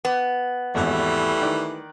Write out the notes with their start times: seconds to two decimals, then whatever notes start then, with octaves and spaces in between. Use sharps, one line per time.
0.05 B3
0.75 G#1 E2 E3 G3 A3
1.42 D#3 D5 F#6